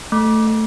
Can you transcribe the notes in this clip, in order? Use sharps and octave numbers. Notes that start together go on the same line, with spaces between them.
A3
A3